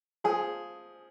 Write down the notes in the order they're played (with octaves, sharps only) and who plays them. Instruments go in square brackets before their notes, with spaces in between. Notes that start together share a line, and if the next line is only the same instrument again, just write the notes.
[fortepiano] F3 G#4